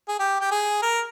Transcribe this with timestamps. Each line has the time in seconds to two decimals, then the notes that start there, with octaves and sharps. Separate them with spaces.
0.08 G#4
0.19 G4
0.40 G4
0.51 G#4
0.82 A#4